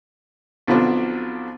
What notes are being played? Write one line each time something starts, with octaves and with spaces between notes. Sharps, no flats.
B1 B2 D3 F3 C4 D4